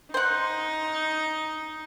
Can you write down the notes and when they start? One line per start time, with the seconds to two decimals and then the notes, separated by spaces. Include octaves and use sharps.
0.14 D#4 C5 F#5